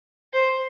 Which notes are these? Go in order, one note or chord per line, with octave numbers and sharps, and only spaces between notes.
C5